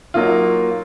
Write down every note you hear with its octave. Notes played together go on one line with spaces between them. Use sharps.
F#3 A#3 D#4 F4